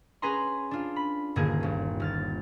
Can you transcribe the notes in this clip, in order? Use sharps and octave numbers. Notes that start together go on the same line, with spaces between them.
C#4 G#4 B4 G#5 A#5 C6
D4 F4
B5
D#1 G2 D3 A#3 G#4 G#6
G1 C#4
D#1 F6 A6